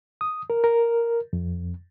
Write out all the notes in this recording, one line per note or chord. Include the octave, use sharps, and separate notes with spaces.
D#6
A#4
A#4
F2